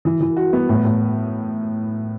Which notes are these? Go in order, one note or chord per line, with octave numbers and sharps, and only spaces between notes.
E3
E3
F#4
B3
A2
A2